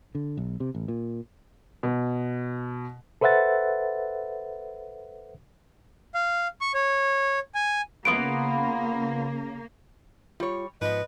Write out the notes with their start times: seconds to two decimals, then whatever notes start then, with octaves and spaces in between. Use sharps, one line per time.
0.15 D3
0.37 B1
0.60 C3
0.75 A1
0.88 A#2
1.83 B2
3.21 A4 B4 C5 E5 F#5 A6
6.15 F5
6.61 C#6
6.74 C#5
7.55 G#5
8.05 C#3 A#3 B3 F4 B4 D7
10.40 G3 F4 C#5
10.81 G#2 F3 B3 B4 D#5